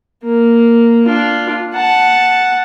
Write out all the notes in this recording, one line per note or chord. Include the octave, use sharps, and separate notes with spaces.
A#3
D4 F4
F#5 A5